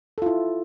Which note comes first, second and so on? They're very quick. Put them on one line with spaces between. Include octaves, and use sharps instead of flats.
A4 F4 E4